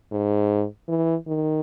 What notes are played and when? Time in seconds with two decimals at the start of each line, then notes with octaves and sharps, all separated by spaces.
0.12 G#2
0.88 E3
1.28 D#3